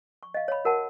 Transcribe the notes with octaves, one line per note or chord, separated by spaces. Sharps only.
C#6
D#5 F5
C#5 F5 B5
F#4 A#4 F#5 A5